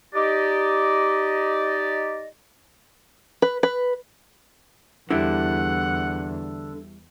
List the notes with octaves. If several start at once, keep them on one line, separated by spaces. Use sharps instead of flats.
D#4 G4 D5 D#5
B4
B4
E2 D3 G3 E4 F#5